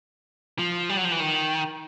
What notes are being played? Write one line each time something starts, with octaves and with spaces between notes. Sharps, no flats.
F3
G3
F#3
F3
E3
D#3